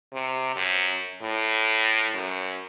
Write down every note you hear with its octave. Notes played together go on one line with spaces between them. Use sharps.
C3
F#2
A2
F#2